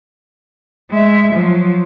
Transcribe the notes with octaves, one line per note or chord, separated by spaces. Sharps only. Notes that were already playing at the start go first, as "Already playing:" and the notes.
G#3 E5
F3 F#3